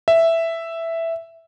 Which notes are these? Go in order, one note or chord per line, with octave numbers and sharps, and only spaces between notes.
E5